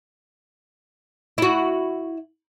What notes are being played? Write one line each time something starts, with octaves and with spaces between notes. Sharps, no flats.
E4 F#4